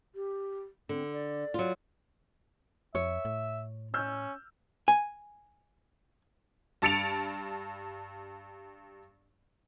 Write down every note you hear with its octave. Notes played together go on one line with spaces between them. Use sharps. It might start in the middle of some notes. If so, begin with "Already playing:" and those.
G4
D3 C4
D5
F#3 F4
F2 C#5 E5
A2
C#4 E6 F6 G6
G#5
G2 A5 A6 C#7 D7 F7